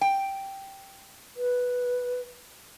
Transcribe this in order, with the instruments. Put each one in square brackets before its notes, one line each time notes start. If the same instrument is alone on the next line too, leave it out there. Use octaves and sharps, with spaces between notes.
[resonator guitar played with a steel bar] G5
[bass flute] B4